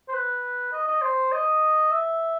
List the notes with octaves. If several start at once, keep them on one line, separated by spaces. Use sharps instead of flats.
C5
B4
D#5
D#5
C5
D#5
E5